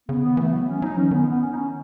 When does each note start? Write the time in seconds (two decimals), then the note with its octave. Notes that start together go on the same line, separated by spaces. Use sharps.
0.08 C#3 B3
0.23 D#3 B3
0.37 E3 A3
0.52 F#3 B3
0.67 C#4
0.82 F#3 D#4
0.97 E3 C#4
1.11 D#3 B3
1.26 B3
1.41 C#4
1.51 D#4
1.56 C#4